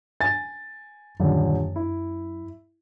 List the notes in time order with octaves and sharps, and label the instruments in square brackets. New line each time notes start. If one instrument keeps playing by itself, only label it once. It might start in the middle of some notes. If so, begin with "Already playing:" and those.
[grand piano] G#5 A6
[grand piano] D#1 D3 [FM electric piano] F#2
[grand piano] E4